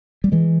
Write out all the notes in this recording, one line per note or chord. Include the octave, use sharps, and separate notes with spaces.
G3
E3 G#3